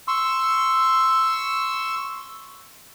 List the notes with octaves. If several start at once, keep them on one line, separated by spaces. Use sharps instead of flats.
C6 C#6 E6